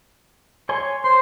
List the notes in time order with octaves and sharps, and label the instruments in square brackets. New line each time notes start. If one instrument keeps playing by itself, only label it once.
[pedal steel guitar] C#5 G#5 C6
[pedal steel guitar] C5 [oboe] C6